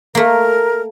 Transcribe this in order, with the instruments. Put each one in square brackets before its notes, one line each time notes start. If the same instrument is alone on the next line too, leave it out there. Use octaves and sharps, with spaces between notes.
[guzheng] A3 A#3 [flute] A#4